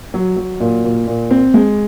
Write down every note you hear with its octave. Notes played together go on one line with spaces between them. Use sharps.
F#3
F#3
A#2
A#2
A#2
C4
G#3